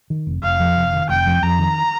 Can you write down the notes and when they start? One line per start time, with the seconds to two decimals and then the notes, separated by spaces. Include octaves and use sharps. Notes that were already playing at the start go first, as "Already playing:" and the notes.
0.10 D#3
0.27 F1
0.43 F1 F5
0.60 F2
0.76 F1
0.93 D#3
1.09 F1 G5
1.26 F2
1.43 F2 A#5
1.59 D#3